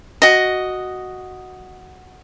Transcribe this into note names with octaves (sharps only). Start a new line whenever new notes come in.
F#4 D#5